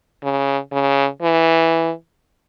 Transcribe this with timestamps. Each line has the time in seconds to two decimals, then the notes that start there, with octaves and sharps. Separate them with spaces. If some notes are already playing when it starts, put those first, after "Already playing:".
0.23 C#3
0.72 C#3
1.22 E3